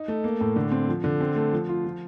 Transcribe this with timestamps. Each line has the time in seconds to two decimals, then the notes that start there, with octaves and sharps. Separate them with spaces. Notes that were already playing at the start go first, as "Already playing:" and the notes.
Already playing: D#4
0.08 A3
0.24 A#3
0.41 A2
0.56 D3
0.71 C4
0.88 F3
1.04 D3
1.20 C4
1.36 A3
1.53 F3
1.69 F4
1.85 F3